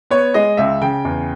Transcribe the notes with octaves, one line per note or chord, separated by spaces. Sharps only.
B3 C#5
G#3 D#5
C#2 E5
C#3 G5
E2